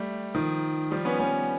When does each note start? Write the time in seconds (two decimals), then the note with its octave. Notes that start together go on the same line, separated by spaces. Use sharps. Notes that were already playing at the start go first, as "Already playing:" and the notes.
Already playing: G3 A3
0.35 D#3 F3
0.91 F3 G3
1.05 B3 C#4
1.19 B3 C#4